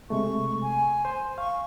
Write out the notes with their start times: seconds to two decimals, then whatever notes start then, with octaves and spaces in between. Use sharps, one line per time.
0.10 C3 G#3 A3 C#6
0.62 G#5
1.05 C5
1.38 F5 C#6